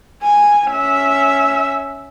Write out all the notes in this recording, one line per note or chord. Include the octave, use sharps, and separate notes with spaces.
G#5
C#4 E5